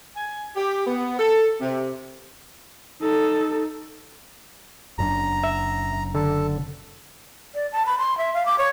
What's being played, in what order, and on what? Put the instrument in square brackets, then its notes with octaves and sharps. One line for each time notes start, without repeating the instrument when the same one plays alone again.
[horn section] G#5
G4
B3
A4
C3
[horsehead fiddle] D#4 A4
[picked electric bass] F#1 F#2 D4 [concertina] A#5
[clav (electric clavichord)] E5
[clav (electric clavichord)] D3 [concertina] A4
[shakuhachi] D5
A5
B5
C6
E5
F5
D6
C#5